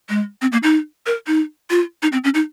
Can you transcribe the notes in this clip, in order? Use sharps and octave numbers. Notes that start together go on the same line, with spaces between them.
G#3
C4
A#3
D#4
A#4
D#4
F4
D#4
C4
C#4
D#4